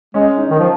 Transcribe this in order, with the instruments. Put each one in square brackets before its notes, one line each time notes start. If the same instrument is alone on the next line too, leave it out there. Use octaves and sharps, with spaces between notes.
[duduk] G#3 [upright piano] C#4
[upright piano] D#4
[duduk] D#3
F3